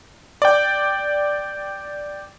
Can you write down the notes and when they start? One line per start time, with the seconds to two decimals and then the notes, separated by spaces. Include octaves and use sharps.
0.42 D5 G5